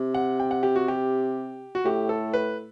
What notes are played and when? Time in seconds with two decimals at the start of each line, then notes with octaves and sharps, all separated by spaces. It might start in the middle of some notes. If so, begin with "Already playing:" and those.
Already playing: C3
0.14 F#5
0.40 G5
0.51 F#5
0.63 G4
0.76 F#4
0.88 G4
1.75 F#4
1.85 A2 G4
2.09 A4
2.34 B4